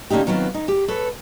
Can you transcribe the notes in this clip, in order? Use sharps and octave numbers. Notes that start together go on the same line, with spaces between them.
D3 A#3 C#4 D#4 G4
D#3 F#3 B3 C4 F4
D#4
G4
A4 B4 C#5